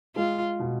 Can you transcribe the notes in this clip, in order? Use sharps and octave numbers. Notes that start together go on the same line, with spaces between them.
G#3 F4
B2